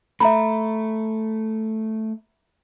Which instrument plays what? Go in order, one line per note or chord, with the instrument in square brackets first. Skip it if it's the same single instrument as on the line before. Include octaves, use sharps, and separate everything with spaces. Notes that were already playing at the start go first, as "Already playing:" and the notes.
[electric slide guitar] A3 [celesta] E5 A#5 B5